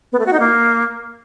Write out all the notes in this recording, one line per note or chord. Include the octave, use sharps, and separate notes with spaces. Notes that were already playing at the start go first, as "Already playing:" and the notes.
B3
A3
F#4
D#4
A#3